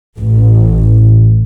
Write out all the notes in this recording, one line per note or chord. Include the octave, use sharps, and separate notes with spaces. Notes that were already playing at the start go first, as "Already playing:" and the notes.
A1